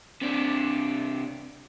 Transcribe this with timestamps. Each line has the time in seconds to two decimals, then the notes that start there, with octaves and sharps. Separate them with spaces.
0.22 C3 D4